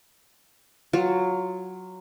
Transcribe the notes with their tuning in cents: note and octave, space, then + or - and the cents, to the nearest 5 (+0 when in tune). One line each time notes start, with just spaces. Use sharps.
F#3 +0 F4 +15